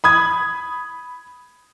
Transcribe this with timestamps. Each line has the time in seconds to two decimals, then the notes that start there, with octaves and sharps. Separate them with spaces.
0.04 B5 D#6 G#6